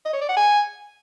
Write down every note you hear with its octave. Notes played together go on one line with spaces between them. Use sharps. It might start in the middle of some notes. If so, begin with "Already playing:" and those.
D#5
C#5
D5
F#5
G#5